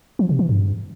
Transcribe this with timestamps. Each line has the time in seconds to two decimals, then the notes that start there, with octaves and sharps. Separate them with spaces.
0.19 F3
0.29 C3
0.39 E3
0.49 G2